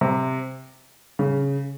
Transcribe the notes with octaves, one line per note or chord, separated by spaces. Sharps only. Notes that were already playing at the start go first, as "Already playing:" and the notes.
C3
C#3